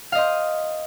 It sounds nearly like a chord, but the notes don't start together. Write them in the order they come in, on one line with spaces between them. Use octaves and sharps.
F5 D#5 C5